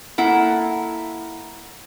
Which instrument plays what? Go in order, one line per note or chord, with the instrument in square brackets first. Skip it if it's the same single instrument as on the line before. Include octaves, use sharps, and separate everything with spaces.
[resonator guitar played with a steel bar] A#3 E4 A4 F#5